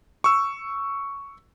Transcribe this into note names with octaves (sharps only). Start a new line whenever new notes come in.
C#6 E6